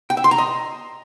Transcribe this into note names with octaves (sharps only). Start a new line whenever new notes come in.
G5
E5
C6
A#5
D#5